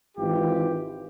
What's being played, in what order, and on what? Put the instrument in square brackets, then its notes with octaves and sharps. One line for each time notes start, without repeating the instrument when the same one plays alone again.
[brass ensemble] G#1 E3 F4 G4